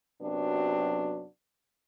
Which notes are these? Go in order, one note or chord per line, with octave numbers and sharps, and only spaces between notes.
F#2 C3 F#3 B3 D4